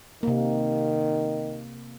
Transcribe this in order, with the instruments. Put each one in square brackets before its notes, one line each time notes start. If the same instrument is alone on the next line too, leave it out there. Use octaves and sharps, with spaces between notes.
[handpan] C3 A#3 [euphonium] D#3